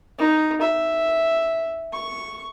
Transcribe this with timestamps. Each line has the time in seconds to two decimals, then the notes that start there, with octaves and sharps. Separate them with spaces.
0.18 D#4
0.61 E5
1.93 C#6